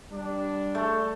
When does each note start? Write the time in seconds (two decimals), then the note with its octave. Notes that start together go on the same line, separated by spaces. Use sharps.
0.12 G3 D4
0.75 A3